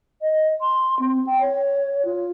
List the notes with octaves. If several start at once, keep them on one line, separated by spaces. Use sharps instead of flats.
D#5
C6
C4
G5
C#5
F4